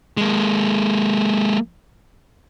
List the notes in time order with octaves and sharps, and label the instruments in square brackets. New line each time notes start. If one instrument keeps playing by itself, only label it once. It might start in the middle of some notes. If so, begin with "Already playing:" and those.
[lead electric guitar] G#3 A#3